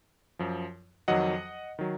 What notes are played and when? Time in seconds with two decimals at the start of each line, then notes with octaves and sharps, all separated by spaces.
0.39 F#2 F3
1.08 F2 D#3 F#3 D#5 F#5
1.79 D#3 F#3